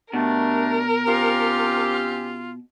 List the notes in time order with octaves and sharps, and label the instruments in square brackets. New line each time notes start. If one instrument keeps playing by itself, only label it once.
[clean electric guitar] B2 [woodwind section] G3 A3 D4 [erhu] A#4
[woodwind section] C4 C#4 G4 [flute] F4